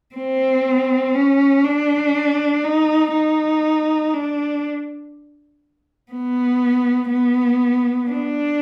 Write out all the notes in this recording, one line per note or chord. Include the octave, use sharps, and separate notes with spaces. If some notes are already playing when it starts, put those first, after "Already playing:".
C4
C#4
D4
D#4
D#4
D4
B3
B3
D4